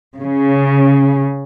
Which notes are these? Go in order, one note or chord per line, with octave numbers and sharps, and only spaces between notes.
C#3